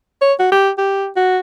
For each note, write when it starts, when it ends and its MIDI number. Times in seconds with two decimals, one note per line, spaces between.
0.21 0.33 73
0.40 0.48 66
0.52 0.70 67
0.78 1.07 67
1.16 1.39 66